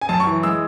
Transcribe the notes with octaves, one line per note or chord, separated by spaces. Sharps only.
G#5
F#2 A5
C#6
E3
G#3 E6